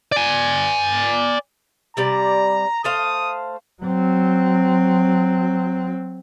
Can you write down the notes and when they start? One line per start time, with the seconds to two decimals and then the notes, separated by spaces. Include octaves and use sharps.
0.12 D5 G#5
1.97 C3 G3 D5 A#5
2.84 A3 C5 F5 D#6
3.83 F#3 C4